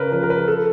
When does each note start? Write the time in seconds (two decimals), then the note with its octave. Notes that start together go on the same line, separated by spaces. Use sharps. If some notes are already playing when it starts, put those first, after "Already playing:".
Already playing: C#3 A#4 B4
0.12 F3 B4
0.23 A#4
0.30 B4
0.48 A4